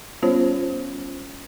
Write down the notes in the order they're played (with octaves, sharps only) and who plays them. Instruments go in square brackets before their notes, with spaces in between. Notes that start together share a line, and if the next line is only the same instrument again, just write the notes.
[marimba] G3 B3 C#4 F4 C5 C#5